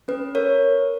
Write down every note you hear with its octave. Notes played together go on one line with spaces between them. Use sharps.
C#4 B4
A#4 C#5